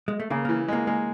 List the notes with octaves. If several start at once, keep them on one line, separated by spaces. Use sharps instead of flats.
G#3
A3
C#3 A#3
E3 A#3
G#3 A#3
G#3 A#3